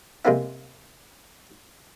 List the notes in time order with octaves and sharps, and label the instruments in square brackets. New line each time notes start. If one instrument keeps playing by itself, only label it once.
[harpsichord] C3 G#3 A#3 B3 E4